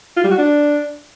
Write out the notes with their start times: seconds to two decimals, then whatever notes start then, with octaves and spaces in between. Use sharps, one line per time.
0.17 F4
0.24 G3
0.31 F#4
0.38 D4